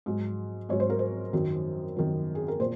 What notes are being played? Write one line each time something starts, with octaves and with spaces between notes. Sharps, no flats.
G#2 F#3
G#2 F#3 C#5
C5
A#4
C5
F#2 D#3 F#3
F#2 D#3 F#3
G#4
A#4
A#2 C5